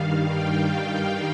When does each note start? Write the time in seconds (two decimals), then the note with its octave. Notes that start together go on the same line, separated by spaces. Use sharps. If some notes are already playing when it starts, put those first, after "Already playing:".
Already playing: G2 D#3 G3 F5
0.24 G5